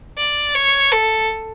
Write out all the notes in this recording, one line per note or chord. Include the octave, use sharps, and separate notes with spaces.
D5
C#5
A4